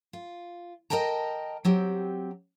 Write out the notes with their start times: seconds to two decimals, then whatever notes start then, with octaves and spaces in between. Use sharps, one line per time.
0.13 F4
0.90 A#4 D#5 G5 A5 A#5
1.65 F#3 C4 G4